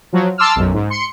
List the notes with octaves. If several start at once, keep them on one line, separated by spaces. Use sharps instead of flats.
F3 F#3
A5 C6 D6 E6 F6
B1 F#2
G#2
C6 C#7